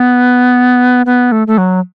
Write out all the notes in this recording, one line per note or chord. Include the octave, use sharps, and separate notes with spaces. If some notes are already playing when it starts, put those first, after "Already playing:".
Already playing: B3
B3
A3
A3
F#3